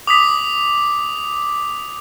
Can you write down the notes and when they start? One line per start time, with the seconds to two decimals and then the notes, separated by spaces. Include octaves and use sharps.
0.07 D6 D#6 B6